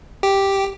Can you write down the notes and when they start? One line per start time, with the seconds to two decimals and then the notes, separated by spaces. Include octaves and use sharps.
0.23 G4